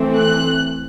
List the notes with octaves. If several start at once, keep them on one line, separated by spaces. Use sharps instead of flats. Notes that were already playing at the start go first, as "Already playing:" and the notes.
Already playing: E3 A3 C4
F#6